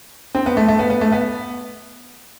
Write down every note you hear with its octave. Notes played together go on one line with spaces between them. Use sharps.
C4
B3
A3
A3
B3
B3
A3
B3